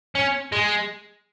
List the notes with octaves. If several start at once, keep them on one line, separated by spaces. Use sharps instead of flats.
C#4
G#3